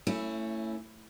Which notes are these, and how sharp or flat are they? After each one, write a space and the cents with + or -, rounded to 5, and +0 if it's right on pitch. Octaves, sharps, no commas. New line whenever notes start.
A3 +30 C#4 +0 E4 +0